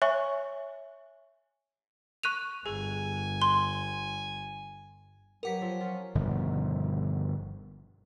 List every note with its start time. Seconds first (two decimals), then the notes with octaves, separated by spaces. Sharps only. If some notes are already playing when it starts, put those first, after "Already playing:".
0.02 C#5 E5 G#5 C#6
2.23 C#6 F#6 D#7 F7
2.66 G1 G#4 G#5
3.42 C6
5.43 F#3 B3 G4 A#4 F#5 B6
5.61 F3 C4
5.81 C#4 F4
6.15 G1 B2 D#3 F3